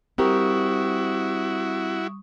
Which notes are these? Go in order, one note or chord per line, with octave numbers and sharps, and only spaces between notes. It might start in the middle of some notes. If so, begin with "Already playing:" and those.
G3 C4 E4 F#4 G4 A#4 C#6 D#6